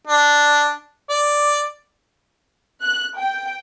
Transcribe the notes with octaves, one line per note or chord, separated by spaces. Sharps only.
D4
D5
F#6
G5